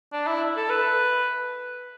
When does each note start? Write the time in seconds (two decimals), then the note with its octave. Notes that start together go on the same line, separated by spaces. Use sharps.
0.13 D4
0.27 E4
0.57 A4
0.70 B4